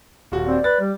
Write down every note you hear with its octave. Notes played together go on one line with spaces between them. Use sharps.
D#1 F#4
C4 D5
B4 A6
G3